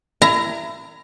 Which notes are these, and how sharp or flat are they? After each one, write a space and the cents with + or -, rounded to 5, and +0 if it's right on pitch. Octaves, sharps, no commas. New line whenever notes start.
E4 +30 A#5 +0